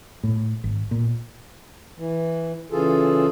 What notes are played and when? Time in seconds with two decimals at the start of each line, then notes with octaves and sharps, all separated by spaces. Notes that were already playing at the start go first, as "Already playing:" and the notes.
0.23 A2
0.64 G#1
0.91 A#2
1.98 E3
2.72 C#3 E3 F4 G#4 A4